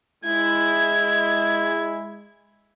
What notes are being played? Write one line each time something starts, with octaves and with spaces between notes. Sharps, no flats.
G#3 E4 G#6